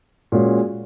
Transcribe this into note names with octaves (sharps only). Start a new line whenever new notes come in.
A#2 G#3 C#4 F#4